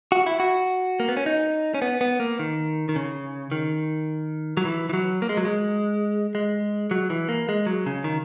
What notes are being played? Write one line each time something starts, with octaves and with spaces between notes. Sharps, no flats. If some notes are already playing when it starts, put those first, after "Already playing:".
F#4
E4
F#4
A#3
B3
C#4
D#4
C#4
B3
B3
A#3
D#3
D#3
C#3
D#3
F#3
E3
E3
F#3
A#3
G#3
F#3
G#3
G#3
F#3
E3
A#3
G#3
F#3
C#3
D#3